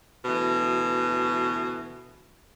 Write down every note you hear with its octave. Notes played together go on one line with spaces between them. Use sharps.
D2 B2 E3